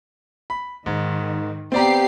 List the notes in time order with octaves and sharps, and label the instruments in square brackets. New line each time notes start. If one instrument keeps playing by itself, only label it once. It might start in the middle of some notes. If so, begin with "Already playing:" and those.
[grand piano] B5
[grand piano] G#2 [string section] D#3
[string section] B3 G4 C7 [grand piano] C4 D5 A#5